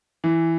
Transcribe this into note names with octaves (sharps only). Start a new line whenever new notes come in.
E3